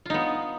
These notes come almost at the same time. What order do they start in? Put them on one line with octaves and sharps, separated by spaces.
F4 D#4 B3